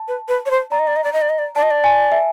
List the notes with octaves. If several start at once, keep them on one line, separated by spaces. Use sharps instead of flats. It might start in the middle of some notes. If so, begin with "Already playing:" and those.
Already playing: A5
B4
B4
C#5
C5
D5 A#5
D#5
D5
D#5
D5
D#5
D5
D#5
D5
D5 A5
D#5
D5
G#5
E5